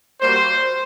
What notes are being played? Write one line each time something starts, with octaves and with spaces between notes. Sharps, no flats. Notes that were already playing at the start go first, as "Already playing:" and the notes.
G3 A#3 F#4 C5